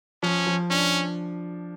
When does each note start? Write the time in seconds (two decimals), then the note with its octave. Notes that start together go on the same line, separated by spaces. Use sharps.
0.23 F3 C#4
0.47 F3
0.70 C#4 D4